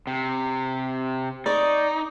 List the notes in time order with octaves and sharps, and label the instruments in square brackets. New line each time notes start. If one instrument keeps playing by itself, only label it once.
[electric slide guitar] C3
[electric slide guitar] D#4 [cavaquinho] D5 C#6